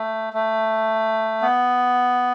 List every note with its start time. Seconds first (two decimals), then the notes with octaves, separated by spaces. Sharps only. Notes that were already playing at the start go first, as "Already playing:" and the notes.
Already playing: A3
0.33 A3
1.42 B3